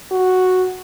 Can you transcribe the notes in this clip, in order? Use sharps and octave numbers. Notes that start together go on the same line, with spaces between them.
F#4